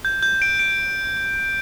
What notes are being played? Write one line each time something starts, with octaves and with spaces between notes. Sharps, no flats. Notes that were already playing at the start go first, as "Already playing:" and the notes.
G6
G6
D7
D7